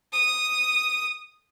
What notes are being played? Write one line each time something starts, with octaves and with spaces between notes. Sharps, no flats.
D#6